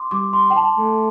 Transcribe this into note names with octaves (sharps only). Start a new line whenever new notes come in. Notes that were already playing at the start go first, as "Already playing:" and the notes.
Already playing: C6 D6
G3 D6
C6
G5
A5
A3